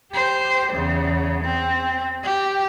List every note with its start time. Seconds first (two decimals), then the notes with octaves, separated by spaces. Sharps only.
0.12 G4 C5
0.72 E2 C#3
1.44 C4
2.24 G4